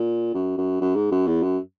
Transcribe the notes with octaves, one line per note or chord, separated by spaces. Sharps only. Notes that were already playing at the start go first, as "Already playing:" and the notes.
Already playing: A#2
F#2
F#2
F#2
G#2
F#2
E2
F#2